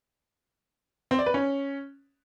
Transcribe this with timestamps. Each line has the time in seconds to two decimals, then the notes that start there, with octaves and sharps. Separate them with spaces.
1.11 C4
1.19 D5
1.26 B4
1.34 C#4